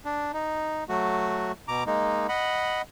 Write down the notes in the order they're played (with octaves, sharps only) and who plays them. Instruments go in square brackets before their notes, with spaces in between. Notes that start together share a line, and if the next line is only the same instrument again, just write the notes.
[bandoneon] D4
D#4
F#3 A3 F#4
B2 A#5 D6
G#3 A#3 D#4
D#5 F#5 B5